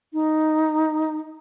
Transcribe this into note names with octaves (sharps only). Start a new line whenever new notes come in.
D#4